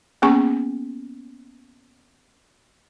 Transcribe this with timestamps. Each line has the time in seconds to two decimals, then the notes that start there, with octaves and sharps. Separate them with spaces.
0.22 A#3 B3 C#4 G#4 G#5 C#6